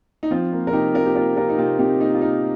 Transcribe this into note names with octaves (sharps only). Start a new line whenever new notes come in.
D#4
F3 C4 F4
A#3
A#4
C3 D#4 G4
C3 F4 A#4
G4
A#3 F4 A#4
C3 F4 A#4
D#4
C3 C4 F4
C3 D#4 G4
A#3 D#4
F4
A#3 D#4